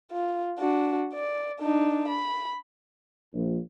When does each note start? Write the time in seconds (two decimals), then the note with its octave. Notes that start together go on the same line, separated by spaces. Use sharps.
0.12 F4
0.59 D4 F#4
1.13 D5
1.60 D4 D#4
2.08 B5
3.34 A#1